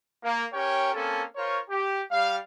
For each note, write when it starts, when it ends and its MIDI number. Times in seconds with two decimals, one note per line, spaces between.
0.23 0.45 58
0.53 0.93 61
0.53 0.93 67
0.53 0.93 70
0.53 0.93 73
0.53 0.93 79
0.93 1.24 58
0.93 1.24 60
0.93 1.24 61
0.93 1.24 69
1.35 1.59 65
1.35 1.59 70
1.35 1.59 72
1.35 1.59 73
1.70 2.02 67
2.11 2.37 55
2.11 2.37 77